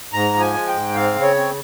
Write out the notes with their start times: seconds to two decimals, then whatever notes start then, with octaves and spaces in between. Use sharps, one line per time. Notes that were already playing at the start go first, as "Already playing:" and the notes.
0.13 G#2 A#5
0.34 F3
0.40 G#5
0.53 G#3
0.68 G5
0.74 G#2
0.95 C4 F5
1.15 C#3
1.22 C#5
1.36 C4